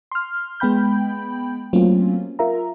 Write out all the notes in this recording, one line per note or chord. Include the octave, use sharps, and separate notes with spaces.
C6 F6
G#3 B3 G5 B5 G6
F#3 A3 A#3 C4 C#4 F4
F4 A#4 E5 A#5